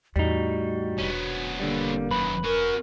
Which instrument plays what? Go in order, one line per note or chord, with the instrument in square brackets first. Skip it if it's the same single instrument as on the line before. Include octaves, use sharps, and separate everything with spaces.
[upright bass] E2 A2 [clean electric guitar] G3 D#4 [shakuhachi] F#4
[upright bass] E1 D4 [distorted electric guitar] B3 C#4
[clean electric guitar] D3 G3 [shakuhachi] A#3
[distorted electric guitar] F#2 D#3 [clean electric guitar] B4
[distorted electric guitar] C#4 F#4 [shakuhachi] A#4